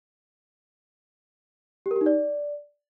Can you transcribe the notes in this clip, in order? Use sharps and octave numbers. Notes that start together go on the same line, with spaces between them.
G4
A#4
G4
D#4
D5